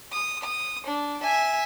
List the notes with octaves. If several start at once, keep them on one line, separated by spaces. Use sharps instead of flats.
D#6
D#6
D4
E5 G#5